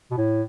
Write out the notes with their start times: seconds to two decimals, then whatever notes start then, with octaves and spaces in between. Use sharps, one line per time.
0.11 B2
0.17 A2